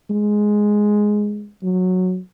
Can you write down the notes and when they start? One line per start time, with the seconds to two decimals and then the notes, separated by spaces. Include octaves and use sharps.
0.10 G#3
1.63 F#3